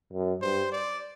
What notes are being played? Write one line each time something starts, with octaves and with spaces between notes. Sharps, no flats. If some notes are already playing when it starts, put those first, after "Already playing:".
F#2
G2 C5
D5